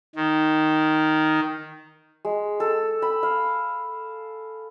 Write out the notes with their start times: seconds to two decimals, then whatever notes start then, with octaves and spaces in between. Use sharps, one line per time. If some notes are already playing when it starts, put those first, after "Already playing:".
0.16 D#3
2.25 G#3
2.60 A4
3.02 B5
3.23 F5